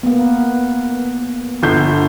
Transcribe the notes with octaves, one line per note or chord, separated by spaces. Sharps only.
A#3 B3
G1 D3 G6